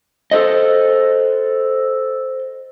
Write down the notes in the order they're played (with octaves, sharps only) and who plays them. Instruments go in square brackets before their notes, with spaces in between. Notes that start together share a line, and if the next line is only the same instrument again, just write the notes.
[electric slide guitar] A4 C5 D#5